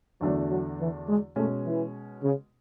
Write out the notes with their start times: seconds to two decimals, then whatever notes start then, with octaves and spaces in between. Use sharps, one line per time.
0.21 E2 D3 F#3 A3 D4 F#4
0.50 F#3
0.79 E3
1.07 G#3
1.36 B2 G#3 A3 C#4
1.65 E3
2.22 C#3